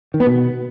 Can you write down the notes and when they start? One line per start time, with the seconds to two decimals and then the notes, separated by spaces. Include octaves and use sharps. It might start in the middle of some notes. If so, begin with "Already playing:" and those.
0.14 D#3
0.20 B3
0.26 B2